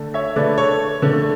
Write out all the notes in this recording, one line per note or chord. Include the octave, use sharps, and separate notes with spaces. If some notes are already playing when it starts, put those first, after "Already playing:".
Already playing: D3 A3
C#5 E5
D3 A3 B4 D5
A4 C#5
D3 A3